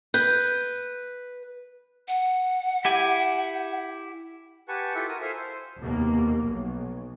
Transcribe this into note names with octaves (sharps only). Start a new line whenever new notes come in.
B4 G6
F#5
E4 G4 G#5
G4 B4 F#5 G#5 A5 C#6
E4 F4 G4 A4 E5
E4 F#4 A#4 D#6
A4 C5 E5 F5 G#5
C5
F1 D#2 B2 A#3
B1